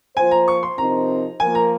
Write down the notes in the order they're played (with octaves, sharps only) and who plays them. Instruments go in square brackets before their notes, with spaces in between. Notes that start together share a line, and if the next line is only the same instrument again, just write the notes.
[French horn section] F3 A#3 F4 C5 [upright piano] G#5
[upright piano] A#5
C#6
C6
[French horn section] C3 F3 C4 D#4 A#4 [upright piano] A#5
[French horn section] F3 A#3 F4 A#4 [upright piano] G#5
[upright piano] A#5